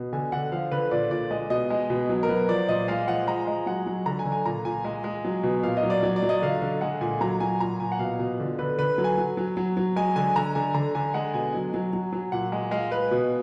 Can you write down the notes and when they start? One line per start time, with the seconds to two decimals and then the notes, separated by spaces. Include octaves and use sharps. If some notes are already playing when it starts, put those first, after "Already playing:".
Already playing: B2
0.13 D3 G#5
0.32 D3 F#5
0.52 F3 F5
0.72 D3 B4
0.91 A#2 D5
1.11 A#2 D5
1.31 G#3 D#5
1.50 B2 D#5
1.70 G#3
1.90 B2
2.09 F#3
2.23 A#4
2.29 F#3 B4
2.49 F3 D5
2.68 A#2 D#5
2.88 G#3 F5
3.08 F3 F#5
3.27 G#3 A#5
3.47 G#3
3.66 F#3 F#5
3.87 F#3
4.06 D3 A#5
4.19 G#5
4.26 D3
4.32 G#5
4.45 A#2 A#5
4.65 A#2 G#5
4.85 G#3
5.04 G#3
5.25 F#3
5.43 B2
5.63 A#2 F5
5.77 D#5
5.83 F#3
5.90 D5
6.03 F#3
6.16 D5
6.23 F#3
6.29 D#5
6.42 D3 F5
6.62 D3
6.81 G#3 F#5
7.01 A#2 G#5
7.21 F#3 A#5
7.40 F#3 G#5
7.60 A#2 A#5
7.80 A#2 G#5
7.92 F#5
7.99 B2 F5
8.19 B2
8.40 D3
8.59 D3 B4
8.78 D3 B4
8.98 F#3
9.04 G#5
9.18 F#3
9.37 F#3
9.57 F#3
9.77 F#3
9.96 G#3 G#5
10.16 D3 G#5
10.36 D3 A#5
10.55 D3 G#5
10.74 D3 A#5
10.95 D3 G#5
11.14 G#3 F#5
11.34 B2 G#5
11.54 F#3
11.74 F#3
11.93 F#3
12.13 F#3
12.32 A#2 F#5
12.52 G#3
12.71 G#3 F5
12.91 G#3 B4
13.11 B2